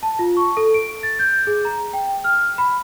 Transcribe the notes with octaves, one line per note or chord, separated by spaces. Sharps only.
A5
F4
C#6
A4
D7
A6
G6
G#4
A#5
G5
F6
B5